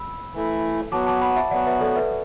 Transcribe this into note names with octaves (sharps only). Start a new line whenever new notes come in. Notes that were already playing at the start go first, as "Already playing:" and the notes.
Already playing: B5 E6
E3 A3 E4
F#3 B3 F#4 A5 D6
A5 D6
F#5 B5
E5 A5
F#3 B3 F#4 D5 F#5
B4 E5
A4 D5
B4 E5